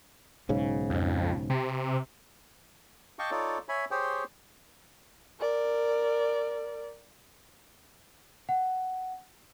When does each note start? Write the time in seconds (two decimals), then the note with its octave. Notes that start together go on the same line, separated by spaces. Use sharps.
0.49 B1 G#2 C#3
0.90 F2
1.50 C3
3.19 D#5 F5 G5 A5 C#6 D6
3.31 D#4 F4 A4 C#5 D5
3.69 C#5 E5 G#5 B5
3.91 G4 G#4 C5 C#5 G5
5.40 A#4 D5
8.49 F#5